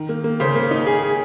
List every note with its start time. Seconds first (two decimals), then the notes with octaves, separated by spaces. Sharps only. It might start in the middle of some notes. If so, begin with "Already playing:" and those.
Already playing: D#3
0.09 A#3
0.24 A#3
0.40 C#3 C5
0.55 A#3
0.71 D#4
0.87 G#4
1.02 G#4